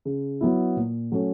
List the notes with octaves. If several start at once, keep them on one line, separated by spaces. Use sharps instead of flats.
C#3
F#3 B3 E4
A#2
F#3 A3 C#4